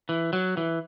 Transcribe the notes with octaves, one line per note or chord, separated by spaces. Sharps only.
E3
F#3
E3